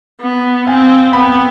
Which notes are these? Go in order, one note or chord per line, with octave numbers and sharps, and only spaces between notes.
B3
C4 F5 G#5
B3 G5 B5